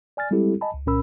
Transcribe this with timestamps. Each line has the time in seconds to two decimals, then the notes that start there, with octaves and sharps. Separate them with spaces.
0.17 D5 G#5 F6 A6
0.31 G3 G#3 C4 E4 G4 A4
0.61 D#5 G#5 A5 B5
0.74 C#2
0.86 C2 A#2 C#4 A#4 B5 E6